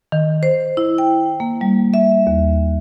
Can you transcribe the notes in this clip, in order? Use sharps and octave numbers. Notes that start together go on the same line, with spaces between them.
D#3
C5
E4
G5
A#3
G3
E5
D#2